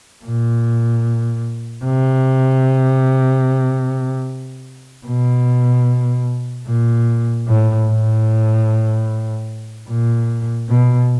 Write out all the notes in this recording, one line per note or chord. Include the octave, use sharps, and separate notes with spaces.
A#2
C3
B2
A#2
A2
A2
A#2
B2